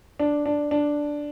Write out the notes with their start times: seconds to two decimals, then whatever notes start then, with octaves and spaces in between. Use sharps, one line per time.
0.20 D4
0.46 D4
0.71 D4